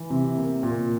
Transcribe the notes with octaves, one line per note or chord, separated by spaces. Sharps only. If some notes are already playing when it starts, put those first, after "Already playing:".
Already playing: E3
C3
A#3
A#2